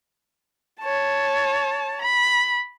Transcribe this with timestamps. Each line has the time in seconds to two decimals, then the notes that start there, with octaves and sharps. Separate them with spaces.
0.81 C#5 A5
2.02 B5